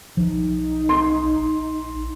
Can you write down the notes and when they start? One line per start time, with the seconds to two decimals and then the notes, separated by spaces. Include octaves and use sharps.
0.17 B1 F3 D#4
0.89 C6
1.33 A#1